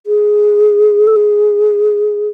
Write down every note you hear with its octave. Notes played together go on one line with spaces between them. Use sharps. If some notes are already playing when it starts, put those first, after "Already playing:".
G#4
A4
G#4